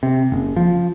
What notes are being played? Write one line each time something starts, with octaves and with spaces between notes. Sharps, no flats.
C3
F#1
F3